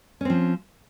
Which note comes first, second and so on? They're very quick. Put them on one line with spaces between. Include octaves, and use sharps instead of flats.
C#4 C4 F3